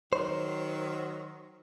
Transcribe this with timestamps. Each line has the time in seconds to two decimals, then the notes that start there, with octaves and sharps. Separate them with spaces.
0.13 D#3 F#3 C5